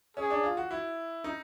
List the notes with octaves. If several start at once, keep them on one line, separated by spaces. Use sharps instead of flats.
C#4 G#4
D4
F4
F#4
E4
D#4